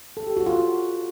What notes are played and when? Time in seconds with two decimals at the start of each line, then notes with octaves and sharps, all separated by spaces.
0.17 A4
0.27 G4
0.37 F#4
0.46 F4
0.56 F#4